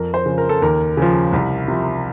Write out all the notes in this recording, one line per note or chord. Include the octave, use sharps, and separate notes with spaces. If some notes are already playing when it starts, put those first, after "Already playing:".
Already playing: F2 A#4
C5
C#3 F3
A#4
A4
D#2 A#4
C#3 F3
C2
C3 F3